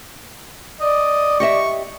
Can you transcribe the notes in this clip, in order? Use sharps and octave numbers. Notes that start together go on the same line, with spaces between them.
D5 D#5
G4 D#5 E5 C#6